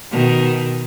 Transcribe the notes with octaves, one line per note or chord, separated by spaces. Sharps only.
B2 D#3